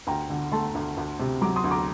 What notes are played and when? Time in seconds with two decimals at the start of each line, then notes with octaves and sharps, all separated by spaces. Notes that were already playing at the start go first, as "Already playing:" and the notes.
0.07 D2 G5 A#5
0.30 D3
0.52 A3 A5 C6
0.75 D2
0.97 D2
1.19 C3
1.41 F#3 A#5 D6
1.56 C6 D#6
1.64 D2
1.71 A#5 D6